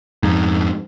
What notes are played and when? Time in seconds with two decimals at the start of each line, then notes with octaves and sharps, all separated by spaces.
0.23 F2 G#2